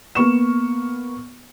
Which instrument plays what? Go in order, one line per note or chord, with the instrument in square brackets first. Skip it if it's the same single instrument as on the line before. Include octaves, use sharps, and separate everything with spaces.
[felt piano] A#3 B3 C#6 E7